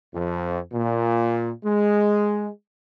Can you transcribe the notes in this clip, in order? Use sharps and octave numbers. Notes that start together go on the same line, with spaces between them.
F2
A#2
G#3